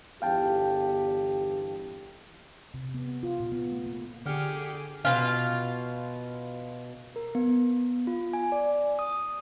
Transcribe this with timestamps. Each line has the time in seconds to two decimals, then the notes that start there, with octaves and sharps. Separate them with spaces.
0.22 G1 E2 G4 F5 G5 A5
2.74 C3
2.94 B3
3.23 F4
3.40 A#2
3.52 B3
3.72 A3
3.86 A#3
4.26 D3 G4 G#4 F6 C#7
5.05 B2 F4
7.16 A#4
7.35 B3
8.07 F4
8.33 G#5
8.52 D5
8.99 D#6